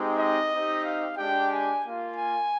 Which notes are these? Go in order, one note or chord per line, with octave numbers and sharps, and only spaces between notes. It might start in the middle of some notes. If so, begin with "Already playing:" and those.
Already playing: G#3 C4 D#4 G4
D#5
C4 D#4 G4
F5
G#3 D4 G4 G5
G#5
A#3 F4
G#5